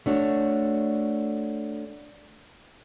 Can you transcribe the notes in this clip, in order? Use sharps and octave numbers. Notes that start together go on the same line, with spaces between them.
A3 D4 F#4 C#5